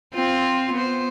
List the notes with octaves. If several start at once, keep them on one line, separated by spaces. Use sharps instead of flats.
C4 F4 C5
B3 C5